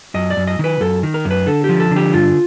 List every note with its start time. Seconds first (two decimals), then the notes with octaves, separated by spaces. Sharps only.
0.14 F#2 D#5
0.30 D5
0.37 F#2
0.47 D#5
0.59 D#3 B4
0.80 F#2 A4
1.03 D#3
1.14 A#4
1.25 F#2
1.31 B4
1.46 D3 A4
1.64 G4
1.69 F3
1.80 A4
1.91 D3
1.96 G4
2.14 G2 F4